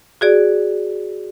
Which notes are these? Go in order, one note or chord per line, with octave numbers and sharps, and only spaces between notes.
F#4 G#4 D5